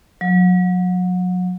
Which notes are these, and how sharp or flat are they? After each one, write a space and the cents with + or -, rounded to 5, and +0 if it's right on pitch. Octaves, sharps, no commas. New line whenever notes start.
F#3 -35